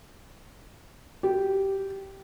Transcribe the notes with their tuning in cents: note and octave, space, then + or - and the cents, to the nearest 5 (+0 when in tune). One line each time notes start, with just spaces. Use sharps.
G4 -10